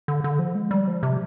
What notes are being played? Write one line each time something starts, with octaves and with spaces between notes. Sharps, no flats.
D3
D3
F3
G#3
G3
F3
C3